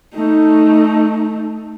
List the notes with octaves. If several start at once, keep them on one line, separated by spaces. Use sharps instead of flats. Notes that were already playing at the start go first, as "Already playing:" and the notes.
A3 D#4